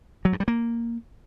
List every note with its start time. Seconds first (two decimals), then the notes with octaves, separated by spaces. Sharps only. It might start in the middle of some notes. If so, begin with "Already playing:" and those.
0.25 F#3
0.33 G2
0.40 G3
0.48 A#3